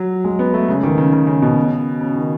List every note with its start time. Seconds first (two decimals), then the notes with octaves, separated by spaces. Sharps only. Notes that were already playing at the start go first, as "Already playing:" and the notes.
Already playing: F#3
0.24 G#3
0.39 B3
0.54 A3
0.68 C#3
0.83 D#3
0.98 C#3
1.13 C#3
1.27 C#3
1.42 B2
2.01 C#3
2.16 D#3